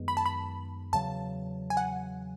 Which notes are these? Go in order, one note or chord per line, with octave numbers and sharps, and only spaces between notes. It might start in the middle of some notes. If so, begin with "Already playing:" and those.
Already playing: F#2 D#3 G#3 B3
B5
A5
B5
E2 C#3 F#3 A5
G#5
F#5